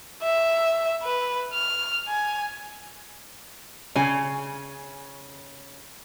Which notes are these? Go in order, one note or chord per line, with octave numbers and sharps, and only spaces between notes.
E5
B4
F6
G#5
C#3 G#5